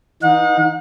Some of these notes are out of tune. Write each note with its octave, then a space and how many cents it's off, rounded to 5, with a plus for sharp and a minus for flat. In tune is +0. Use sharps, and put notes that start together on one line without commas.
E3 -30 D#4 +0 F#5 -40